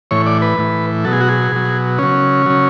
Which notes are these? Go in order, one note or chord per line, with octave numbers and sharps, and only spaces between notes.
A2 E3 C#5
D5
B4
A2 E3
B2 F#3 A4
G#4
F#4
G#4
B2 F#3
C#3 F#3 C#4
C#3 F#3